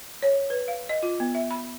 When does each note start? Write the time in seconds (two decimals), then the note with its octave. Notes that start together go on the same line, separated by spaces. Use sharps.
0.23 C#5
0.50 B4
0.68 F5
0.89 D#5
1.03 F4
1.20 B3
1.35 E5
1.51 B5